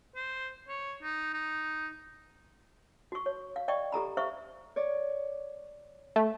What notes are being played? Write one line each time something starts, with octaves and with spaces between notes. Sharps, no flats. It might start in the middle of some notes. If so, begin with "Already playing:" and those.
C5
C#5
D#4
D#4
F#4 C#6
C#5
F5
D5 D#5 G5 C#6
G4 A4 A#5 B5
C5 E5 F5 C#6
C#5 D5
A3